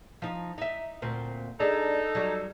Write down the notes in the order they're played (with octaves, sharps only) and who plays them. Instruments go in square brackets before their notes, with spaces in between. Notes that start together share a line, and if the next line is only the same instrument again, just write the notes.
[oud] F3 D#4
D#4 E5
D2 A#2 C4
[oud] G#3 D4 [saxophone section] D#4 A4
[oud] F#3 G3